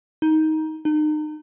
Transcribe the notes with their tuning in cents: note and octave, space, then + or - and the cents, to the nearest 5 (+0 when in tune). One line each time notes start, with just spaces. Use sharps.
D#4 +15
D#4 -35